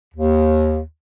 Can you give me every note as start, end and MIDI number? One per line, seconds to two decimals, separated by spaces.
0.15 0.80 39